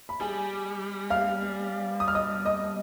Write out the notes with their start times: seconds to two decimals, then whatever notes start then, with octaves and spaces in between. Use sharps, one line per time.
0.09 B5
0.20 G3 G#4 G#5
1.10 F5 F6
2.00 D#6
2.08 F6
2.15 D#5 D#6
2.45 D#5 D#6